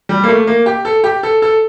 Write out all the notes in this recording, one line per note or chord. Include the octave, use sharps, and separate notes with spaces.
G3
A#3
A3
A#3
G4
A4
G4
A4
A4